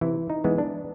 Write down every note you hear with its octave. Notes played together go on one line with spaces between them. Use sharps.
C3 E3 E4
D#4
E3 G#3 B3
D4